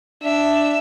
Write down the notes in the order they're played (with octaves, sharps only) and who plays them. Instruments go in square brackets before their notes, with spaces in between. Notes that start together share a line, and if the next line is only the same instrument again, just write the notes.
[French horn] D4 [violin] E5